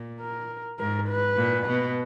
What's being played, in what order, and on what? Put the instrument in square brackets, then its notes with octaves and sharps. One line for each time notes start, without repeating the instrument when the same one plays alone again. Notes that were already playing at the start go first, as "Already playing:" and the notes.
Already playing: [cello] A#2
[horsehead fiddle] A#4
[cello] G#2 [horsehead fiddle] A#4
[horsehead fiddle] B4
[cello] A#2
B2